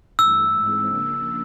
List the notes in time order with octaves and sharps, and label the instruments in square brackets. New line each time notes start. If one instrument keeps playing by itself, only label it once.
[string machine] G2 E3 A3 [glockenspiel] E6
[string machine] G#2 E3 G#3 C4
C#3 F3 A#3 D4